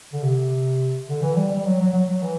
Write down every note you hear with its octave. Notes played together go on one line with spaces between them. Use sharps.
D3
C3
D3
E3
G3
G3
F#3
F#3
F#3
F#3
E3